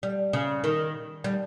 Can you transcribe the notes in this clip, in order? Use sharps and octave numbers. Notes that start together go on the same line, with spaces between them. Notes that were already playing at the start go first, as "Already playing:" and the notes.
G3
C#3
D#3
G3